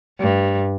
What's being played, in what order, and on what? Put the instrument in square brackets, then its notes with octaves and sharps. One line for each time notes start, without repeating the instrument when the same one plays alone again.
[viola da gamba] G2